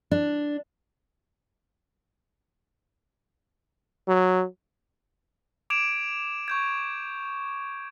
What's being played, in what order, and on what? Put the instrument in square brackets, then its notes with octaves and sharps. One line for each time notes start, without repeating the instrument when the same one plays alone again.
[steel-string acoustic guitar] D4
[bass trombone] F#3
[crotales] D6 G#6 D7 E7 F7
C#6 G6 G#6